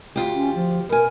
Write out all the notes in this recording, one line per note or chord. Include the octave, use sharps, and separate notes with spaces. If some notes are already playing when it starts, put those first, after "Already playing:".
D2 F4 G4
C#4
F3
B2 A#4 G#5